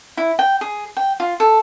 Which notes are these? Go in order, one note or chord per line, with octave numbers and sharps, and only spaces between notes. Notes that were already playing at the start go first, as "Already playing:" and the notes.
E4
G5
G#4
G5
F4
A4